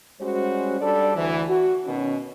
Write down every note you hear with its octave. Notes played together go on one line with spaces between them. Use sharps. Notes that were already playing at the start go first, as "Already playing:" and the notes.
G3 G#3 C#4 F#4 C5
G3 D4 A4 D5
D2 E3
F#4
B2 D#3 C#4